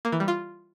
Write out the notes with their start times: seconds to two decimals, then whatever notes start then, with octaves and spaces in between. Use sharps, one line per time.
0.05 A#3
0.12 E3
0.20 G3
0.28 F4